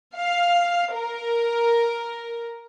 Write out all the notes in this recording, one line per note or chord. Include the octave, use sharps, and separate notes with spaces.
F5
A#4